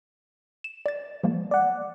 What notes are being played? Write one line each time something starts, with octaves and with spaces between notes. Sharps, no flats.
E7
D5 A6
F3 G#3 A#3
D5 F#5